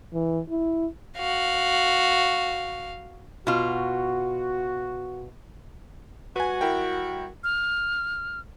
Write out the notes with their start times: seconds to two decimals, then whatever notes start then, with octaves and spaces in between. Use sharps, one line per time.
0.14 E3
0.50 E4
1.18 F#4 F5
3.47 B2 F4 F#4
6.36 G3 F#4 B4 G#5
6.61 E4 A#4 G5
7.44 F6